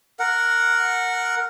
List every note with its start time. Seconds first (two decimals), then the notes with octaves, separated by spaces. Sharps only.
0.19 A#4 F#5